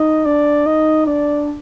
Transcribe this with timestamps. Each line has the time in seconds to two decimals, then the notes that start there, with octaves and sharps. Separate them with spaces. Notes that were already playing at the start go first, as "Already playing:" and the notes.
Already playing: D#4 D#5
0.25 D4 D5
0.66 D#4 D#5
1.06 D4 D5